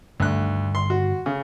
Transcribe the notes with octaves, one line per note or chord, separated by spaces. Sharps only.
D2 G2 D3 D#3 F#6
C6
F#4
C#3